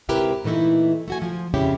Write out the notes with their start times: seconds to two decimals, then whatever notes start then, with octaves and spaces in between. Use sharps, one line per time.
0.09 G#2 C3 E4 G4 A#4 B4
0.44 A#2 E3 A3 D#4 E4
1.08 A3 F#4 G#5
1.22 F3
1.54 F2 C#3 C#4 E4 G4